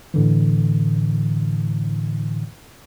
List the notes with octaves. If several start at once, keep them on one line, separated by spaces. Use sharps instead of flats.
A2 D3 E3